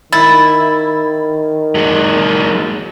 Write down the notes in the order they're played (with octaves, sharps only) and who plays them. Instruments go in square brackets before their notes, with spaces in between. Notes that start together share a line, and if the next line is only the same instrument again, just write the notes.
[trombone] D#3 [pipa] E4 [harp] A6
[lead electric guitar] F#3 G#3